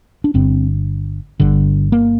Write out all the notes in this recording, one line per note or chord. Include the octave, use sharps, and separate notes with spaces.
D4
G1 G2 D3 C4
G1 G2 D3
A#3